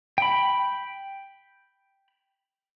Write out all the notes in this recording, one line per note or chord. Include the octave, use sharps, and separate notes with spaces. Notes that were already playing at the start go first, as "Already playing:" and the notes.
G5 B5